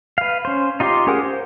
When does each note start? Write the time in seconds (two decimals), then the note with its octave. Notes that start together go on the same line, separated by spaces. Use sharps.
0.18 B4 F5
0.45 C#4 C5
0.80 D#4 F4 G4 C6 D6
1.07 C#4 G4 G#4 A#4 F#5
1.23 C5